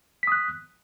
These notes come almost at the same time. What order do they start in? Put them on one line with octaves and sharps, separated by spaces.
B6 D#6 F#6